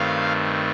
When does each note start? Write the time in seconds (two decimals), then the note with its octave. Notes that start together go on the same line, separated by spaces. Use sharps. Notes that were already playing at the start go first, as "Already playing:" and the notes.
Already playing: G2 D#3 A3 C4 F5